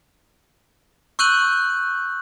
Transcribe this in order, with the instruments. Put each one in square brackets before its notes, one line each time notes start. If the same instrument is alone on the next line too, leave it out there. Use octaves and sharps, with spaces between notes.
[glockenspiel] C#6 E6 F#6 G6 D#7 F#7